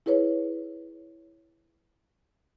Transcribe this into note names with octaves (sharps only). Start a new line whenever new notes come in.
E4 G#4 B4 C#5